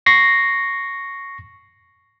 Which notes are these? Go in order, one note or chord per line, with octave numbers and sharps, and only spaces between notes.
C#6 A#6 C7